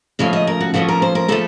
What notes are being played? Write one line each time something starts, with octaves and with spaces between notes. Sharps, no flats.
C#3 F3 A3 C#4 F5
D#5
A#4
F#4
C#3 F3 A3 C#4 F#4
A#4
C5
A#4
C#3 F3 A3 A4